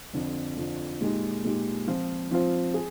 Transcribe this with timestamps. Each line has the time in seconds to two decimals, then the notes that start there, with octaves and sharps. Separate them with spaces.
0.13 F2 D3 F3
0.57 F2 D3 F3
1.00 A#2 G#3 D#4 G4
1.44 A#2 G#3 D#4 G4
1.88 F3 C4 F4 C5
2.31 F3 C4 F4 C5
2.74 G#4